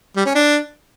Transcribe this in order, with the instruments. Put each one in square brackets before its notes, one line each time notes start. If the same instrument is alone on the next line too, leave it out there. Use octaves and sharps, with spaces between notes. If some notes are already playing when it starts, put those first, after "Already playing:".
[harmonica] G3
C#4
D4